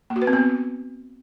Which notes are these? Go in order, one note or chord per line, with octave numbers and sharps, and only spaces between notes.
A#3
F#4
B4
C4
B3